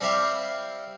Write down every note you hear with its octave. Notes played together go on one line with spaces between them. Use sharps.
G3 C4 E4 G4 E5 F5